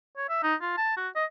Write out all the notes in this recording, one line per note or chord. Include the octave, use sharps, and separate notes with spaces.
C#5
E5
D#4
F4
A5
F#4
D#5